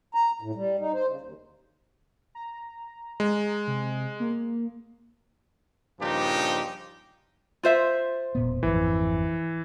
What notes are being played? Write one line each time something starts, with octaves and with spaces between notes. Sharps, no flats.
A#5
A2
G3
D#4
C5
C#3
D#2
A#5
G#3
C3
A#3
G2 A#2 C#3 F3 D#4 G4
F4 C5 E5
E1 A#2 B3
G#1 F2 E3